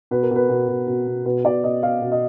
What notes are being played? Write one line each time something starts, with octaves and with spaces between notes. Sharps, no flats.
B2 B4
A#4
B2 B4
B2
B2
B2
B2
B2 B4
B2 D5
B2 D#5
B2 F5
B2
D#5